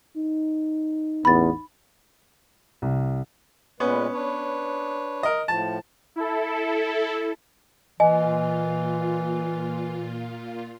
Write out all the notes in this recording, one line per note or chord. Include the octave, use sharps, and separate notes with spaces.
D#4
A1 E2 B3 B5 A6
C2
A#2 G#3 B3 C#4 B4
D4 B4 C#5
A#4 D#5
A2 F3 A5
E4 A4
A#2 E3 F4 D#5 G#5